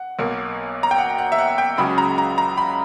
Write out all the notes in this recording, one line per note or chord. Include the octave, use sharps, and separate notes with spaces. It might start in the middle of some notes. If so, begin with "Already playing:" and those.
Already playing: F#5
B1 B2 A#3
A#5
G5
F#5
F#5
E5
F#5
G5
C#2 C#3 F#3 C#4 B5
A#5
A#5
A#5
B5